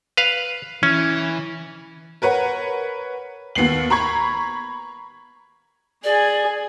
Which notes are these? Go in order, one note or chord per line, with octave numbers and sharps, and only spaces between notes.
B4 F5
E3 C#4
A#4 B4 C#5 F#5
D#2 B3 C7 F#7
A#5 B5 C#6 G#6
G#4 D5 G#5